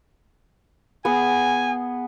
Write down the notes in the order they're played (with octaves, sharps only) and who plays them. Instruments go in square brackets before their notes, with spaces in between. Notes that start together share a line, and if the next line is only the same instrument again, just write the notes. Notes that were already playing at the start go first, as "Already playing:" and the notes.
[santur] B3 G#4 [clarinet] G#5